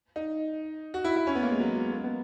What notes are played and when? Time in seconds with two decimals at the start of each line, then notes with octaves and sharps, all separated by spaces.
0.16 D#4
0.94 F#4
1.04 E4
1.16 E4
1.27 C#4
1.35 B3
1.43 A#3
1.51 G#3
1.60 F#3
1.76 G#3
1.92 A#3
2.04 B3